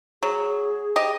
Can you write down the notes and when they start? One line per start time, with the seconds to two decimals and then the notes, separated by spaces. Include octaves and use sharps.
0.23 F#3 G#4
0.96 G4 D#5